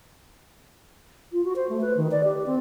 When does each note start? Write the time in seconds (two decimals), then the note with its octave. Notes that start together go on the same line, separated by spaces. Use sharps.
1.32 F4
1.44 F#4
1.56 C5
1.69 A3
1.81 B4
1.97 D#3
2.11 D5
2.24 G4
2.46 C4